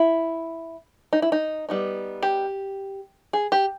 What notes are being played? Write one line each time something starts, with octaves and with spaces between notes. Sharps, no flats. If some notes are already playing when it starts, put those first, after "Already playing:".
Already playing: E4
D#4
E4
D#4
G3 B3 D#4
G4
G#4
G4